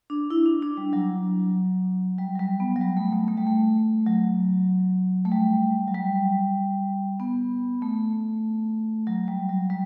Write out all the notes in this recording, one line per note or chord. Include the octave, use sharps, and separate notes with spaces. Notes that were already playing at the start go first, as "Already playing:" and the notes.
D4
E4
D4
D4
G3
F#3
G3
F#3
G3
B3
F#3
G3
A3
A3
A3
G3
A3
F#3
A3
G3
F#3
G3
B3
A3
F#3
G3
F#3
G3